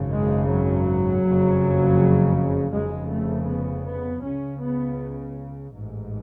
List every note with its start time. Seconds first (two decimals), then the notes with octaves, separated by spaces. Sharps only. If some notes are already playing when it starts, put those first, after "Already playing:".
Already playing: G#1 F#2 C#3
0.11 G#3
0.49 F#3
1.23 F#1 F2 C#3
2.73 F1 F2 C#3 G#3
3.11 A3
3.48 B3
3.86 B3
4.23 C#2 C#3 C#4
4.61 B3
5.73 A1 G#2